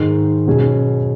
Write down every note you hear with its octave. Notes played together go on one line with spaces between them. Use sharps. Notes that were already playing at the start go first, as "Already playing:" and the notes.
Already playing: G#2 D#3 G#3
B2 F#3 C#4 G#4